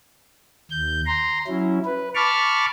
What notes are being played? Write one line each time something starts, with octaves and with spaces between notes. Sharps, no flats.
D#2 G6
A#5 C6
F#3 C#4 E4
B4
A5 B5 C#6 D6 F6